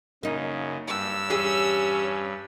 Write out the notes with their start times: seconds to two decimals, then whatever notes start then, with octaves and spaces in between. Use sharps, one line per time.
0.23 F#2 C#3 A#3 D#4
0.88 F#1 G2 E6
1.30 E2 C#4 G4 G#4